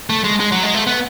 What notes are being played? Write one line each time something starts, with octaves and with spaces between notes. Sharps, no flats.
A3
G#3
G#3
F#3
G#3
A3
B3